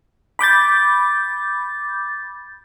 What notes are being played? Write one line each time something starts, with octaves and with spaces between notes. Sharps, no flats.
B5 D6 G6 A6